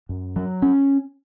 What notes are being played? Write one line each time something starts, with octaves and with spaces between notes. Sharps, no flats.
F#2
F#3
C#4